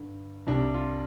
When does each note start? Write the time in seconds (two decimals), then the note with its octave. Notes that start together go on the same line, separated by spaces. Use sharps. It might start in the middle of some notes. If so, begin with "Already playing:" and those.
Already playing: G2 D3
0.47 C2 C3 G3 D4
0.74 F4